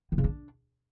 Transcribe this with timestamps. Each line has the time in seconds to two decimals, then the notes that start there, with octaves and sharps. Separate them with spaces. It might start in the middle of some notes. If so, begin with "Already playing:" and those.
0.12 D#3
0.18 C#3
0.24 D4